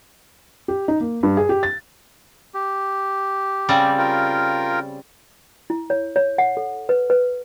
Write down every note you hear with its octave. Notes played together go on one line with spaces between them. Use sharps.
G4
D#4
A#3
G2
G#4
G4
A6
G4
C#3 G3 C4
F4 A#4 G5
E4
C#5
C#5
F#5
A4
B4
B4